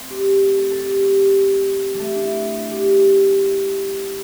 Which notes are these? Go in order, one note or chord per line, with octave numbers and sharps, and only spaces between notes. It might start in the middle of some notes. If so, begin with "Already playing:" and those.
Already playing: A3 C4
G4
G4
A4
A4
G4
G4
G3 A3
D4
E4
G4